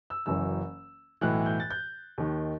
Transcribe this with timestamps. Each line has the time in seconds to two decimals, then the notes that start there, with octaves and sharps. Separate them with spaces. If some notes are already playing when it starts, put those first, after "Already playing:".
0.10 E6
0.26 F#1 F#2 E3 E6
1.21 B1 A2 E3 F#6
1.46 G6
1.60 A6
1.70 G6
2.18 D#2 D#3